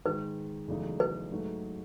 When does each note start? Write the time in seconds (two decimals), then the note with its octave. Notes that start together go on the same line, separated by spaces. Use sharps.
0.05 G#2 D#3 G#3 B4
0.68 E2 C#3 F#3 A3 D#4
1.00 B4
1.31 G#2 F#3 A3 D#4